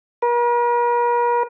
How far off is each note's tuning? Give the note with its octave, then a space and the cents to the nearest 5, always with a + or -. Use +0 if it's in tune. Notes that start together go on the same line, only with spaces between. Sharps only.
A#4 +45